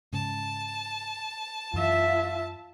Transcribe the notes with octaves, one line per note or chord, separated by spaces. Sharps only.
G#2 C#3 A5
F#2 E3 F4 E5